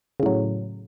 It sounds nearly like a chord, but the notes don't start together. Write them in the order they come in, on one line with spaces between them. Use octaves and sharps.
C#3 A2 F#3